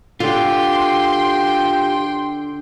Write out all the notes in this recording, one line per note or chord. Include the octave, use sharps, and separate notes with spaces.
D3 F4 G4 G5 C6